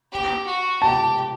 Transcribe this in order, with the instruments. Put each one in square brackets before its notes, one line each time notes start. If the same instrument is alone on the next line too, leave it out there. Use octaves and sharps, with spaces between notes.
[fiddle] G4
F#4
[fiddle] G4 [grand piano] A5